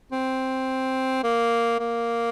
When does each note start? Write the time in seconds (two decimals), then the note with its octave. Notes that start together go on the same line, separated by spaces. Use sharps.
0.12 C4
1.23 A#3
1.79 A#3